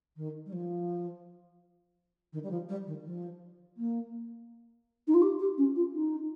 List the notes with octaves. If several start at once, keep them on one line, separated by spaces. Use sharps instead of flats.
D#3
G3
F3
D#3
G3
F3
G3
D#3
F3
A#3
D#4
F4
G4
G4
C#4
F4
D#4